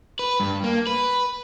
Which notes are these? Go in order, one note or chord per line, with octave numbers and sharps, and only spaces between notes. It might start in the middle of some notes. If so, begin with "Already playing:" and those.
B4
G2
A#3
B4